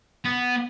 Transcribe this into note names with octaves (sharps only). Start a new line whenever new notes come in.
B3